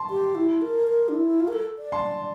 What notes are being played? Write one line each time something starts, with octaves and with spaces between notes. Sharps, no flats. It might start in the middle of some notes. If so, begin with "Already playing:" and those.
Already playing: A5 C6
G4
E4
A#4
A#4
D4
E4
F4
A#4
A4
D5
A5 C6